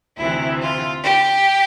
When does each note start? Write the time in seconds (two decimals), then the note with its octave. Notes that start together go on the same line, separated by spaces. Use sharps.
0.17 D2 C3 E3 E4
0.61 F4
1.04 G4